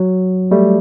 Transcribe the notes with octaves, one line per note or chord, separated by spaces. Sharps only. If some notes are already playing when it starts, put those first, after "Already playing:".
Already playing: F#3
G3 A3